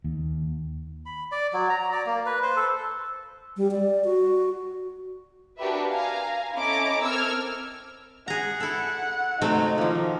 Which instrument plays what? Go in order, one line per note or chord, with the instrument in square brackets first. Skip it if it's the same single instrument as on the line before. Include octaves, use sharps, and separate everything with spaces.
[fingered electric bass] D#2
[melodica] B5
D5
F#3
A#5
D5
A#3
B4
C5
A4
[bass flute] G3
D5
F#4
[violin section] D4 F#4 G4 A#4 B4 E5
F5 G#5 A#5
C#4 E4 A4 D#5 A#5 D6
C4 A4 A#4 E6 F6 G#6
[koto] G#4 A#5 [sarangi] F#5
[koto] E4 A4
[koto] C3 F#3 A3 [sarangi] D#4
[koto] D#3 A#3 [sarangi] F3